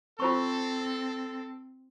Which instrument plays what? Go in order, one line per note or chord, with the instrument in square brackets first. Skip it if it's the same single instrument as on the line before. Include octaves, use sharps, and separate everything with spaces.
[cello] C4 [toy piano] F4 C5 C#6 [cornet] A4